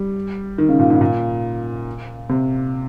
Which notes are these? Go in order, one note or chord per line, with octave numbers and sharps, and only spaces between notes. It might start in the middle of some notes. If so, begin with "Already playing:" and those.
Already playing: G3
D#3
C#3
A#2
G#2
A#2
C3